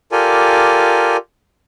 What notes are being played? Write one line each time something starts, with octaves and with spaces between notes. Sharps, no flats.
F4 G4 A4 A#4 D5 G#5